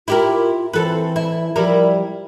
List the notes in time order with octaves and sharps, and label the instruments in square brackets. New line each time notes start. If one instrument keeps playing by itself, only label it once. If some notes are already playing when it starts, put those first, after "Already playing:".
[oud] E4 G4 A#4 [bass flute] F4
[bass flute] E3 [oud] C4 A4 B4
[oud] E4
[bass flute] F3 [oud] G3 E4 A#4